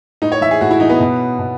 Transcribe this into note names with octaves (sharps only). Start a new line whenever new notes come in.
A2 D#4
C#5
E3 E5
G#4
A2 F#4
E4
E3 D#4
B3
B2
B2